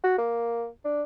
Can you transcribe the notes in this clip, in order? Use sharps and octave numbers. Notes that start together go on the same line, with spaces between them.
F#4
A#3
D4